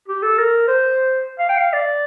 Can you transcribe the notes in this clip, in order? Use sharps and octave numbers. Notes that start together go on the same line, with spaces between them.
G4
A4
A#4
C5
F5
G5
F5
D5